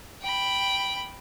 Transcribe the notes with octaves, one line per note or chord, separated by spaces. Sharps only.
G5 B5